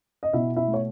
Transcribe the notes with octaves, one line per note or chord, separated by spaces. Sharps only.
D#5
B2 E4 E5
E4 E5
A3
C#5